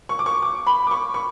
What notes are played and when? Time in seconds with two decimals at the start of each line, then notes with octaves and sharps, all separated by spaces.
0.09 C#6
0.19 D6
0.26 C#6
0.42 D6
0.67 B5
0.87 D6
0.91 C#6
1.14 C#6